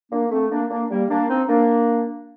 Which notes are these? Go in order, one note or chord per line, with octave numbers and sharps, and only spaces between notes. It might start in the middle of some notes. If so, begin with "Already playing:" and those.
A#3 D4
A3 C4
A#3 D4
A#3 D4
G3 A#3
A#3 D4
C4 D#4
A#3 D4